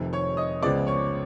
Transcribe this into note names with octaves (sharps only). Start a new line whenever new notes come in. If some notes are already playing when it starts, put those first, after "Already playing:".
Already playing: F1 F2 C3 D#3
C#5 C#6
D#5 D#6
C#2 C#3 F3 G#3 B3 D5 D6
C#5 C#6